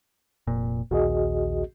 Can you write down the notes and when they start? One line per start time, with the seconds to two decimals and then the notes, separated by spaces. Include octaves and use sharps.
0.47 F1 A#2
0.91 A#1 D#2 F#4 G#4 D#5